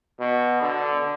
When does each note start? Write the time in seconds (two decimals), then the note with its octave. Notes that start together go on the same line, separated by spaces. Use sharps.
0.19 B2
0.61 D3